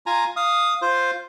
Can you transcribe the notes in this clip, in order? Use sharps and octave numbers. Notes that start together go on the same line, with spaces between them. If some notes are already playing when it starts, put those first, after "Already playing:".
F4 G#5 A#5
F5 D#6
F4 C5